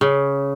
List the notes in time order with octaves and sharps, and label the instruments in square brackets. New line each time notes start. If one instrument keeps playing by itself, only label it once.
[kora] C#3